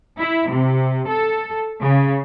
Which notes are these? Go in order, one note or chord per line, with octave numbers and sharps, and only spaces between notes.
E4
C3
A4
C#3